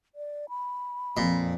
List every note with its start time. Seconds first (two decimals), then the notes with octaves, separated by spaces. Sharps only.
0.15 D5
0.49 B5
1.17 F2 A#2